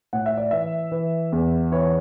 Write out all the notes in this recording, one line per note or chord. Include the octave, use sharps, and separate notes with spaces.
A2 F#5
E5
D5
E3 E5
E3
E2
E3 C#5